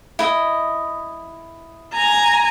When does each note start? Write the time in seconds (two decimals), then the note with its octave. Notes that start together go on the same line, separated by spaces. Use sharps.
0.19 E4 D#5
1.94 G#5 A#5